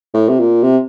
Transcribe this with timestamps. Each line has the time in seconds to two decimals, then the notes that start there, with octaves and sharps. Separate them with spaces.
0.14 A2
0.28 C3
0.39 A#2
0.63 C3